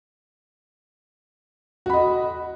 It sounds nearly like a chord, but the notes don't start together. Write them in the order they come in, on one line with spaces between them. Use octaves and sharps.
F#4 B5 D#5